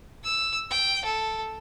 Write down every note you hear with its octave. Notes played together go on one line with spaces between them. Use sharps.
E6
G5
A4